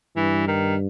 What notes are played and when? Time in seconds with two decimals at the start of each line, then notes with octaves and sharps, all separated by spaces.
0.16 G2 E3
0.48 D#3